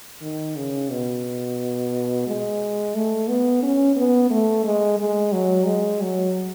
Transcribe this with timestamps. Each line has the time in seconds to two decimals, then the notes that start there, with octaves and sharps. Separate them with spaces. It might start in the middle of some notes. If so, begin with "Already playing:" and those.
0.21 D#3
0.56 C#3
0.91 B2
2.27 G#3
2.95 A3
3.28 B3
3.63 C#4
3.96 B3
4.30 A3
4.64 G#3
4.99 G#3
5.32 F#3
5.66 G#3
6.01 F#3